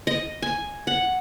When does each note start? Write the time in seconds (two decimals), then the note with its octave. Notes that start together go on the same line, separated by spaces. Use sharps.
0.07 D#5
0.42 G#5
0.87 F#5